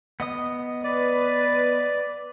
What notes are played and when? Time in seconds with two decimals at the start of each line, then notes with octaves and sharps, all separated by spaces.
0.20 B3 D#5 D#6
0.84 B4 D5